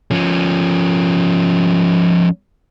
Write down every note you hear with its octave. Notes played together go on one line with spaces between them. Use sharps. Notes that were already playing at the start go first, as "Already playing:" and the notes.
F3 C#4